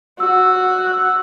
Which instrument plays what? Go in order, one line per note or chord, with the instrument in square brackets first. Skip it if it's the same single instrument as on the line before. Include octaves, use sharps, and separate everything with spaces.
[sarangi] F#4 [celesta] E6
[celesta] F#6
E6